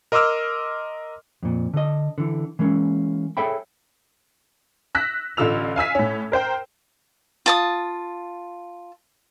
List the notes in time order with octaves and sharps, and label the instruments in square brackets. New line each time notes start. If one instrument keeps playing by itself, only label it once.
[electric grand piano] A#4 D#5 C6 D6 E6 F6
[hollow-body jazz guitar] F2 A#2
D3 D#5
D3 E3
E3 G#3 A#3 C#4
G#4 A4 C#5 E5 G5 B5
[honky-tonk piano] E6 F#6 A#6 B6
A1 D3 F4 E6 F7
F5 G#5 E6 B6
A2 C#4
A#4 C5 G5
[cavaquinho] F4 A5 D#6